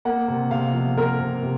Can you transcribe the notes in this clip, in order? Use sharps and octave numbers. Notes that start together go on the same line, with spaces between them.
A#3 F#5
C3
C3 F5
F3
C3 A#4
C3
C3